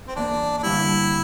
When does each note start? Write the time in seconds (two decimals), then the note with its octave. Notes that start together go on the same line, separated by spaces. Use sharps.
0.08 C4
0.15 E2 E3 A#3 D4
0.58 D4
0.63 G2 D3 G3 E4